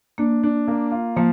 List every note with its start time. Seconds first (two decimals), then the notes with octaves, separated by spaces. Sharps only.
0.18 A#3 D4
0.43 D4
0.68 A#3
0.91 F4
1.16 F3 A#3